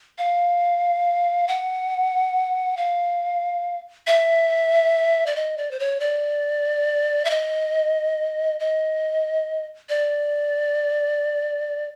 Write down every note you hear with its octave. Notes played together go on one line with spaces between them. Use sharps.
F5
F#5
F5
E5
D5
D#5
D5
C5
C#5
D5
E5
D#5
D#5
D5